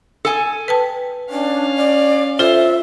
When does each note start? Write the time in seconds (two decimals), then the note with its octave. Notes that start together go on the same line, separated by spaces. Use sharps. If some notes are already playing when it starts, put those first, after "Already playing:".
0.25 A4 G#5
0.68 B4 G5 A5
1.30 C#4 D4 F5
1.76 D5
2.39 F4 A4 C5 E5